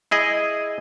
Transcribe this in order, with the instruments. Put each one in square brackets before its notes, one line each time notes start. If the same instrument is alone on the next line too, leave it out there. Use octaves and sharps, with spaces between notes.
[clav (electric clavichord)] E4 G#4 D#5